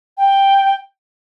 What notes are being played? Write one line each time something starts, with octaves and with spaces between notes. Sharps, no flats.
G5